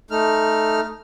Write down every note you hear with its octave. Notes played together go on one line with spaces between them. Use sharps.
A3 D#4 F6